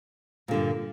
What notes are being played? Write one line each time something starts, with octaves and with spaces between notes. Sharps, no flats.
G2 A#2 D3